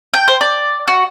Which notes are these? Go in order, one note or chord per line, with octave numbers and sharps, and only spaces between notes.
G5
C5
D5
F#4